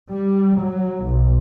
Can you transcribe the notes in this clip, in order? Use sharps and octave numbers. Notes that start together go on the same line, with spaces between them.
G3
F#3
B1